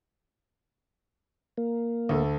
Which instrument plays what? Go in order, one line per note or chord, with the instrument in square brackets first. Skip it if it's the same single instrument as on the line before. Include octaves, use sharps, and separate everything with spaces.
[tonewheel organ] A#3
[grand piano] D2 A4